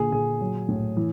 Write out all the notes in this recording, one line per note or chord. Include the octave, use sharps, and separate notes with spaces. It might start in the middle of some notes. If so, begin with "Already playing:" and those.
Already playing: A#2 D3 G#4
A#2 G#4
F#3
A2
E3